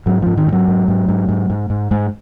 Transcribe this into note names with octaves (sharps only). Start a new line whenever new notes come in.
G#2 F#3
G#2 F3
D#3
G#2
F#3
G#2
G#2
G#2
G#2
G#2
G#2
G#2 G#3